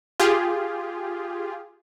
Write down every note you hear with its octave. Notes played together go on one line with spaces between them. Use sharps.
F4 G4 G#4